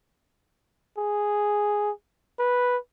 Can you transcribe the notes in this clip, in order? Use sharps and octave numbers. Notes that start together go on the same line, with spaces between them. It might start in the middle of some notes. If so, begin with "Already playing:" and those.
G#4
B4